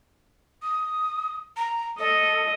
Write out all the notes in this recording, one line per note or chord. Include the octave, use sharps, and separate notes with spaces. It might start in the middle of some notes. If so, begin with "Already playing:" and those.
D#6
A#5
A4 D#5